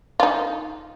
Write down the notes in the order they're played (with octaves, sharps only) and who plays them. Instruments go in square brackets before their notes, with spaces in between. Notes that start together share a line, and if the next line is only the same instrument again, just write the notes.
[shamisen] D#4 F4